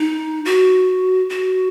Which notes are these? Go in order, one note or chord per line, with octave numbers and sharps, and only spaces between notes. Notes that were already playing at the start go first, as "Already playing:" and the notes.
Already playing: D#4
F#4
F#4